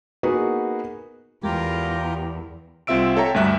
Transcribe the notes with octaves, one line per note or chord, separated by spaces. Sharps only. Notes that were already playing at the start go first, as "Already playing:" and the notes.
A#3 B3 D#4 F#4 G#4 B4
E2 G#3 F4 G4 A#4
C2 C4 F4 E5 E6 D7
A4 C#5 E5 G5 A5 A#5
D2 G2 G3 E5 F#6